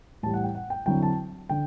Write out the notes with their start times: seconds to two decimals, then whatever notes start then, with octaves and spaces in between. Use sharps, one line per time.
0.23 A2 E3 G3 A5
0.34 F#5
0.44 G5
0.55 F#5
0.70 G5
0.86 D3 F#3 C4 E4 G5
1.03 A5
1.49 D3 G5